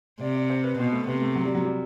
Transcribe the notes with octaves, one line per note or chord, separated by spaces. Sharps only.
C3 D5
D5
C5
B4
B2 C4
A3
C3 B3
A3
F#3
G3
F#3
G3